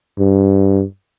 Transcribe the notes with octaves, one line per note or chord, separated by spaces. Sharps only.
G2